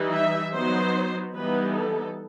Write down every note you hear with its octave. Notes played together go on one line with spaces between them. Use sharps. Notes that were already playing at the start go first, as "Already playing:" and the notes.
Already playing: E3 G3 D#4
E5
F#3 B3 D#4 C5
E3 G3 B3 D#4 B4
A4